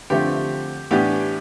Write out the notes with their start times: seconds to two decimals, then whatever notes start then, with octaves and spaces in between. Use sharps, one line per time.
0.10 D3 F3 A3 C4 G4
0.91 A2 E3 B3 D4 G4